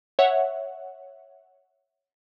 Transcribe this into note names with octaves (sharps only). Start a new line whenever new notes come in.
C#5 E5 F#5